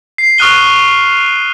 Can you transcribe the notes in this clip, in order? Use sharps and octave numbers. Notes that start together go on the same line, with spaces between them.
C7
C#6 D#6 F6 F#6 D#7 G7